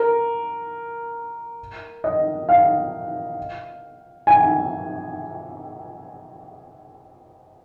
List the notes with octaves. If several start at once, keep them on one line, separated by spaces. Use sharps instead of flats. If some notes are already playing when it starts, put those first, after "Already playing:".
Already playing: A#4
D#5
F5
G#5